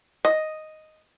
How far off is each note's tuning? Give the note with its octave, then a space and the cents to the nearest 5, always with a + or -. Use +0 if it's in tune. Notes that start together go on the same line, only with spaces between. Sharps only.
D#5 +0